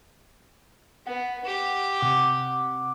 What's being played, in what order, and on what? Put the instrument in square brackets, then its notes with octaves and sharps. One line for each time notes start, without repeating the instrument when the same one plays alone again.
[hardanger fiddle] B3 [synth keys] F#5
[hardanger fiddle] G4
[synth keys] C3 F#5 D6